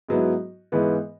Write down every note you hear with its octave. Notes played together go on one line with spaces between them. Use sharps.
G#2 F#3 B3 E4
G#2 E3 B3